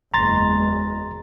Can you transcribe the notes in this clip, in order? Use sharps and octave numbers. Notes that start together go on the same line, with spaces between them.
F#1 E2 G#3 A#5 C6 A6